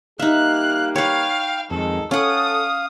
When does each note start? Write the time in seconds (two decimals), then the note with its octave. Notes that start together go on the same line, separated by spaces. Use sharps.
0.19 G3 A#3 D#4 G4 E5 F5 F#6
0.96 B4 C#5 F5 G5
1.70 F2 D#3 G#3 A4
2.11 C#4 A4 F5 F#5 D#6